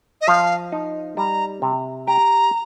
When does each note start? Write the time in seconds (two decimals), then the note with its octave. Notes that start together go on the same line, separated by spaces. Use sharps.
0.21 D#5
0.28 F3 F5
0.72 D#4
1.17 G3 A#5
1.62 C3
2.07 G4 A#5